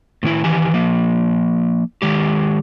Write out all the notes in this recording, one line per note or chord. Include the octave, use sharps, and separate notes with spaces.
A2 D#3 C#4 E4
D#3 E3 G4 G#5
F3 A#3
D#3 G#3 G4